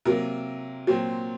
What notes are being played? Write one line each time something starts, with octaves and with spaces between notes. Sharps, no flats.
C3 F#3 A#3 A#4
A#2 F#3 C4